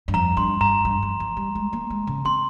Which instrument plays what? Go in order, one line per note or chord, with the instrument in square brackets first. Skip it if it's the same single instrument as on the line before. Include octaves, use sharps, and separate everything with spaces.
[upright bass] G2
[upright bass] F2 [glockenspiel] A#5
[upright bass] G2 [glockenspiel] C6
[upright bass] G2 [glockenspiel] A#5
[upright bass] G2
F3
F3
G3
G#3
A#3
G#3
C#3
[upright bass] C4 [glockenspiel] C6